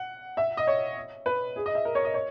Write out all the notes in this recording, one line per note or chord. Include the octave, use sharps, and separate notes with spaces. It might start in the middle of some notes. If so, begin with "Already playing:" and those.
Already playing: F#5
E5
D#5
C#5
B4
G#4
D#5
E5
A#4
C#5
D#5
C#5